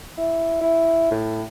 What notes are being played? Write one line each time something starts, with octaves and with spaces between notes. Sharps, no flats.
E4
E4
A2